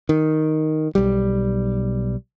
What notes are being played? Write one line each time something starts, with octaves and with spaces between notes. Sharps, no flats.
D#3
B1 G3